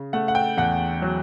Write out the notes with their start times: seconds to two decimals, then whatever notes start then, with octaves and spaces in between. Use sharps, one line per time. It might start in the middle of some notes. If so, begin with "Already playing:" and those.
Already playing: C#3
0.13 A3 F#5
0.28 F#5
0.35 G5
0.58 E2 F#5
1.02 F#3